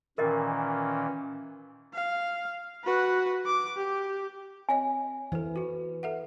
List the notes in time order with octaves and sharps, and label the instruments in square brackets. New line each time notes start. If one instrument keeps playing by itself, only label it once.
[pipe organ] A#2 D#3 E3 [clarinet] C#4 [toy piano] A#4 D#5 G5
[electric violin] F5
F#4 B4
D6
G4
[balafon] C4 C#5 D#5 [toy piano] G#5
[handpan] E3 [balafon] A4 C5
[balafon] E4 F#4
A4 E5 F#5